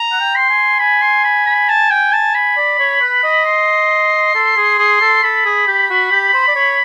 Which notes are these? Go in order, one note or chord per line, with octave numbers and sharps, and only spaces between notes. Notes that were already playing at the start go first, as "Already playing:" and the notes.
Already playing: A#5
F#5
G5
C6
G#5
G#5 B5
C6
B5
B5
A5
G5
A5
B5
D5
C#5
B4
D#5
C6
A4
G#4
G#4
A4
A4 B5
G#4
G4
F#4
G4
C5
D5
C#5